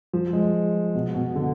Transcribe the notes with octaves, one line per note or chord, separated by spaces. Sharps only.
F3
G#3
B2
B2
D3